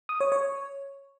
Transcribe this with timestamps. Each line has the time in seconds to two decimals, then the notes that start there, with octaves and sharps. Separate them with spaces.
0.09 D#6
0.20 C#5
0.32 C#5